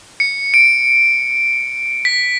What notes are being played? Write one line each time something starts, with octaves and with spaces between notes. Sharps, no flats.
C#7
D7
B6